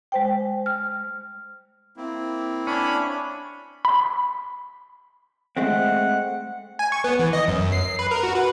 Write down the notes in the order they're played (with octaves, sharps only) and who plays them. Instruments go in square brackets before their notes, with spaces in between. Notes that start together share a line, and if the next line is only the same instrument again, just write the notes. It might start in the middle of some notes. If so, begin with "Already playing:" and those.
[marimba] G#3 C5 G5
F6
[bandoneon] A#3 C4 E4
[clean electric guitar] C#4 [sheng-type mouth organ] D4 B5
[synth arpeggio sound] B5
[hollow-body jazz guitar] G#3 A3 C4 [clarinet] F#5
[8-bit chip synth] G#5
C#6
B3
E3
D#5
F#2
C7
B4
A#4
F#4
B4